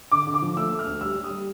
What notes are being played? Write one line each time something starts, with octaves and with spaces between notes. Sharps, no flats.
D3 D6
D3
D6
F3
A3 E6
A3
F6
D2
G3 E6
G3
D#6
G3